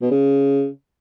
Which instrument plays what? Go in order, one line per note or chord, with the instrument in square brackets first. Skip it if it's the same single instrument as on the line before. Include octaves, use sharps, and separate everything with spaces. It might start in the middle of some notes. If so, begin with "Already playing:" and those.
[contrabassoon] B2
C#3